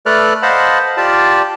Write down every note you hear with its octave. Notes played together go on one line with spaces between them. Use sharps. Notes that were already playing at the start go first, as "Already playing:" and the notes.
A3 A4 B4 D5 F6 F#6
C5 D#5 F5 F#5 A5 B5
F4 G4 D5 A5